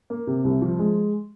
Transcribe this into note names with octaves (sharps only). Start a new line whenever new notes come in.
A#3
C3
C2
F3
G#3